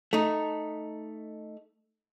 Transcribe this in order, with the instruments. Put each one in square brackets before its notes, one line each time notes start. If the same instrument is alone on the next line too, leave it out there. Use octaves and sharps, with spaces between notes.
[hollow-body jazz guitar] A3 D#4